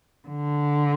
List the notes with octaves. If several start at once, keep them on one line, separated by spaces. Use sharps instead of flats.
D3